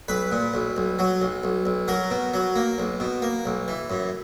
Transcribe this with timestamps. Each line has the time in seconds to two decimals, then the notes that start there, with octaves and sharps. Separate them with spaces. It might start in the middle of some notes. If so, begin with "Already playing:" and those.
0.08 B1 B4
0.32 A#2
0.54 B1
0.77 B1
0.99 F#3
1.21 B1
1.44 B1
1.66 B1
1.88 F#3 A#4
2.10 B2
2.34 F#3
2.56 A#3
2.78 B1
3.00 B2
3.22 A#3
3.46 B1
3.68 E3
3.90 F#2